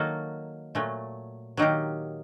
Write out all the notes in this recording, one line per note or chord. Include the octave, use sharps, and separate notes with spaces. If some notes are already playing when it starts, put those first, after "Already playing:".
Already playing: D#3 F#3 A#3 F#4 A4
A#2 F#3 A3
D#3 F#3 A#3 D#4 G4